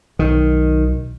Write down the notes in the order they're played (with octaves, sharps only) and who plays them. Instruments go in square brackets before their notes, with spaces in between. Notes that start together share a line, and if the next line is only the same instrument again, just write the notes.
[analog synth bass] B1 [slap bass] D#3